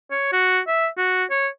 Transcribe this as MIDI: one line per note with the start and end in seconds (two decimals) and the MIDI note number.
0.11 0.30 73
0.32 0.60 66
0.67 0.88 76
0.97 1.24 66
1.30 1.47 73